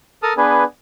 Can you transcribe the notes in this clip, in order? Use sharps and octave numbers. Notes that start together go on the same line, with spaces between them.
A4 A#4 A5 D#6 F6
B3 D4 G#4 B4